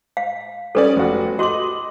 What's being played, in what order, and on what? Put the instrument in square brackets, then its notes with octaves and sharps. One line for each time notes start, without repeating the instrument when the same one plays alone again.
[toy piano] F5
[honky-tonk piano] G3 C#4 D5 [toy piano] A4 B4 D#6
[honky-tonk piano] F1 F#4
[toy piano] F#4 C6 D6 [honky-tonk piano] D#5 F#7